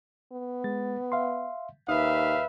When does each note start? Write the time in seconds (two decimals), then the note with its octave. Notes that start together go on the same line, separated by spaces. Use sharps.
0.32 B3
0.64 G#3 A6
1.12 E5 F5 C6
1.88 D#2 D#4 B4 E5 F5 D#6